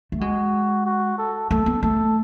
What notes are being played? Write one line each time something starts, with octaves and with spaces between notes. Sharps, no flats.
A3
G#3 F#4
F#4
A4
A3 A4
B3
A3 A4